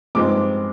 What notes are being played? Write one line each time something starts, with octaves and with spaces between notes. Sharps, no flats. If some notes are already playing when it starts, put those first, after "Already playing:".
G2 F3 G#3 C4 D#4 D6